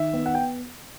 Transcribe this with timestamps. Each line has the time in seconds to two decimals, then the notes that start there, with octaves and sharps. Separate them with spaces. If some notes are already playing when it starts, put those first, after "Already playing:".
Already playing: D#3 E5
0.13 B3
0.26 F#5
0.35 G5